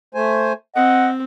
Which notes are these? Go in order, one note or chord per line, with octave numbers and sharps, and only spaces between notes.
A3 C5 G#5
C4 D#5 F#5